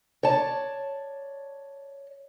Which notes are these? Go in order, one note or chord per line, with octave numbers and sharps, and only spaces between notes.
C#5 D5 A5